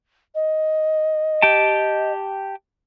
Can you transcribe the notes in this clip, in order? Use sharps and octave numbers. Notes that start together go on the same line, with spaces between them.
D#5
G4 G5 A5